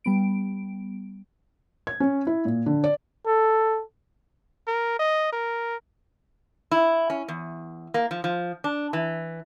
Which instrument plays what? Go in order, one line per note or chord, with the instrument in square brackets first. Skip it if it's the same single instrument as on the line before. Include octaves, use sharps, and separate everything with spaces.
[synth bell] G3 B3 D7
[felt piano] G#6
C#4
E4
A#2
D3
D5
[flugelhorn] A4
[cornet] A#4
D#5
A#4
[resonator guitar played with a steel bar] E4
C#4
E2
A#3
F3
F3
D4
E3